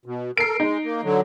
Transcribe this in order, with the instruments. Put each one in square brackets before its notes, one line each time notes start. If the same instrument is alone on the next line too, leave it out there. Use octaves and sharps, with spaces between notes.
[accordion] B2
[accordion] A4 A#4 [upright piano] C7 D7
[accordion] G#3 [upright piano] D#4
[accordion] A#3
D3 F#3